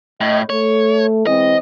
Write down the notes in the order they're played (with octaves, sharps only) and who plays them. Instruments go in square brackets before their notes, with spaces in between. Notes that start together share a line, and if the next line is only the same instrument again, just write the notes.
[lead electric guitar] A2 [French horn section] D#5
[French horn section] A3 [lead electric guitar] C#5
[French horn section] E3 G#3 C4 [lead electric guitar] D#5